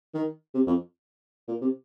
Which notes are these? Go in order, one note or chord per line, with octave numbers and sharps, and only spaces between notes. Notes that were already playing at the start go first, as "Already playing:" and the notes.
D#3
C3
F2
A#2
C3